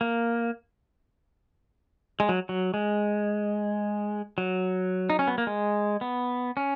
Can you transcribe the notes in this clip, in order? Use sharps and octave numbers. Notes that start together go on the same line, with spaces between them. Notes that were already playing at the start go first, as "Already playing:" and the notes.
A#3
G#3
F#3
F#3
G#3
F#3
D#4
C#4
B3
A#3
G#3
B3
C#4